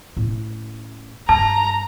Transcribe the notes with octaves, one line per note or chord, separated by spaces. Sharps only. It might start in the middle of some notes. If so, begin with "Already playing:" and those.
A2 C#4
G2 A5 A#5